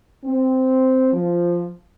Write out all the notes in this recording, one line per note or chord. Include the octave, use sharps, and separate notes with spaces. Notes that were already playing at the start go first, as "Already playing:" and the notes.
C4
F3